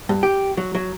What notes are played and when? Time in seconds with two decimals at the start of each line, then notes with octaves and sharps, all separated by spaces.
0.09 G2
0.23 G4
0.57 F#3
0.75 F#3